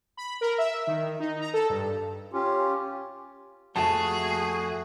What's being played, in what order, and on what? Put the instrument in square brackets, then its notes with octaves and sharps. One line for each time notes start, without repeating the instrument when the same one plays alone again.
[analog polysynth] B5
A#4
E5
D#3
D#4
A#5
A4
G2
[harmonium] C#4 F4 G4
[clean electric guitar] F2 [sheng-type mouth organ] A3 F#4 [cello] G#4 [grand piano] A5